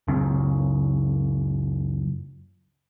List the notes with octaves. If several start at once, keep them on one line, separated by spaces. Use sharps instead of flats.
C#2 F#2 C#3 C4